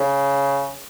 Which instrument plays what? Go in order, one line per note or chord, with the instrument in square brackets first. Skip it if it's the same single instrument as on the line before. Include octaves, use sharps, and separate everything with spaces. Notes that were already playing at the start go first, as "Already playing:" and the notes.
Already playing: [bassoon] C#3